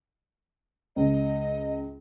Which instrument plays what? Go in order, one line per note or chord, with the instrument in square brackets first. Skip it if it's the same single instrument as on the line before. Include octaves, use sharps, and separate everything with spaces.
[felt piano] C#2 [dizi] D#5